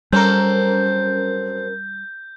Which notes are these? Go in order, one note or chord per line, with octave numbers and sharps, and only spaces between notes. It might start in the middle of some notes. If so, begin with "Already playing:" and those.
F#2 G3 C4 C#4 A4 A#4 G6